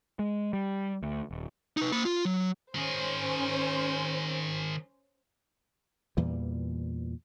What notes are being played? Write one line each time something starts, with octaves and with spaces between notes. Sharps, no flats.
G#3
G3
D2
D#1
D#4 B4
A#3 B5
F4
F#3
D#3 C#4 G#4 C5
E2 A#2 E3 G3